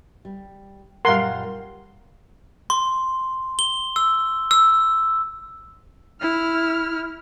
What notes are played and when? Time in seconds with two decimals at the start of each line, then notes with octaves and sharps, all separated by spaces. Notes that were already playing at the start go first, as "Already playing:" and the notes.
0.25 G3
1.05 F#2 A#2 G3 A#4 F5 F#5 C6
2.70 C6
3.59 G7
3.96 E6
4.51 E6
6.21 E4 F6